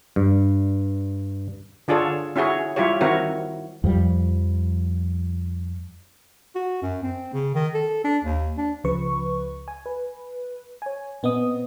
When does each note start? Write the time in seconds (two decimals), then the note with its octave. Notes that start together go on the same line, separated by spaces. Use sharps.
0.16 G2
1.88 D3 D4 F4 G#4 A4 C#5
2.36 C#4 E4 F#4 G#4 C#5
2.76 G3 E4 F4 G4 C#5
3.01 D#3 C4 E4 F#4 A#4 C#5
3.84 F2 F3 G3
6.55 F#4
6.82 F#2
7.03 C4
7.33 C#3
7.54 D#3
7.75 A4
8.04 D4
8.24 D#2
8.57 D4
8.84 C#2 C#3 F3 B4 C#6
9.68 G#5
9.86 B4
10.82 C#5 G#5
11.23 A#2 B3 C4 D#5 D#6